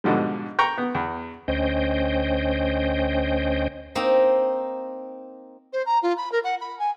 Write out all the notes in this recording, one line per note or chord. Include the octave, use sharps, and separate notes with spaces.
G#2 B2 D3 F3 G3
G5 A#5 C#6
B3
E2
D2 C#4 C5 D#5 G5
A#3 C4 D#4
C5
A#5
F4
B5
A#4
F#5
B5
G#5